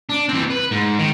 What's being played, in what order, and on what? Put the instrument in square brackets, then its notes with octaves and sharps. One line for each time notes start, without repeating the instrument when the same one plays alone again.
[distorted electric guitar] D4
E3 C4
B4
G#2
D#3